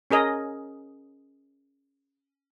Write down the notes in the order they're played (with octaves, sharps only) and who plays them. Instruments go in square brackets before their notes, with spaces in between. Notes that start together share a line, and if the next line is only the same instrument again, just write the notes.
[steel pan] C#4 G#4 A#4 D#5